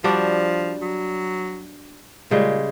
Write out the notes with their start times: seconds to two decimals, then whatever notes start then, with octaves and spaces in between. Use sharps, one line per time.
0.04 F3 G3 D4 F#4
0.82 F#3
2.31 A#2 C#3 G3 G#3